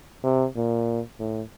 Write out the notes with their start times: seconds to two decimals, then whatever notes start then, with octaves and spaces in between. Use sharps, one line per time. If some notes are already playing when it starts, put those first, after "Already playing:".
0.24 C3
0.56 A#2
1.19 A2